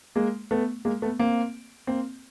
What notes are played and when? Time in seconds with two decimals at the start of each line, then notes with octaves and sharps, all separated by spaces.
0.16 G#3 A#3
0.51 A3 B3
0.85 G#3 A#3
1.02 A3 B3
1.19 A#3 C4
1.87 A#3 C4